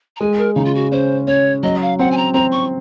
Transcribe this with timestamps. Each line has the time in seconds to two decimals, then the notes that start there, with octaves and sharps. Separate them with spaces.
0.16 A#5
0.20 G#3 G#5
0.38 A#4
0.55 C#3 D#4
0.65 F4
0.75 F#4
0.92 C#4 C5
1.27 C#4 C#5
1.63 F#3 D#5
1.82 F5
1.99 C4 F#5
2.11 G#5
2.17 A#5
2.34 C4 A#5
2.52 C#6